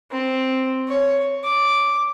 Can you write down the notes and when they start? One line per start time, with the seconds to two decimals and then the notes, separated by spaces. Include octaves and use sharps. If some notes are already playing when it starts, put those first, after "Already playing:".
0.11 C4
0.88 C#5
1.44 D6